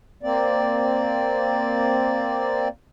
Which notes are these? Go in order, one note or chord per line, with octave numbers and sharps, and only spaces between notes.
A#3 C4 D5